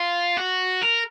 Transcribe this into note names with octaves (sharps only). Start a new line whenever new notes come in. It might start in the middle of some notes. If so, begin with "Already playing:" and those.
Already playing: F4
F#4
A#4